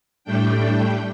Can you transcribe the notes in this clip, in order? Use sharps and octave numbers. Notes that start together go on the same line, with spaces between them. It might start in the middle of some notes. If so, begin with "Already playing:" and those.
A2 G3 A3 D4 G5